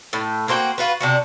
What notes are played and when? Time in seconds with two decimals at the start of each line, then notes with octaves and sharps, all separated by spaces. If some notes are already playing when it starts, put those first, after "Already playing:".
0.13 A2
0.48 A#3 C4 F#4 G5
0.78 F4 F#4 B4
1.00 C3 D4 F#4